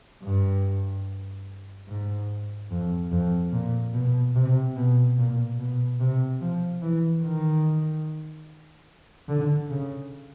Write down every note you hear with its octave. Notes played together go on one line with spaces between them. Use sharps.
G2
G#2
F2
F2
A#2
B2
C3
B2
A#2
B2
C3
F3
E3
D#3
D3
C#3